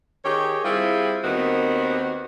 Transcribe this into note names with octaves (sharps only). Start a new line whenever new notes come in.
D#3 G4 G#4 C#5
G3 C4 E4 F4 G#4
D#2 D#3 B3 C4 F#4